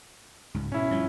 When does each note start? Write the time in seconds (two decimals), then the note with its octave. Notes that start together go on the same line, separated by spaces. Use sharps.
0.54 C#2 G#2
0.72 B2 C#4 E4
0.91 G2 F3